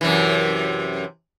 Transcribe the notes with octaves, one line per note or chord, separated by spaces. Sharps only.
F#2 C3 E3